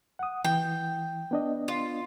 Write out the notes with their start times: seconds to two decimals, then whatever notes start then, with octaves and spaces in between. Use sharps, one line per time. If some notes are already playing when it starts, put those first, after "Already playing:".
0.19 F#5 D#6
0.45 E3 G5
1.31 B3 D4 D#5
1.68 F4